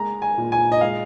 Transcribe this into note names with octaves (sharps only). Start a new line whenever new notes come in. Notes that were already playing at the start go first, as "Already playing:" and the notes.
Already playing: G#3 A#3 A#5
G#5
A#2
G#5
D#5
G#3 F5